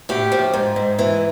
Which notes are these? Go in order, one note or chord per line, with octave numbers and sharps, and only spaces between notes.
A2 G4
F3
G#2
G#2
E3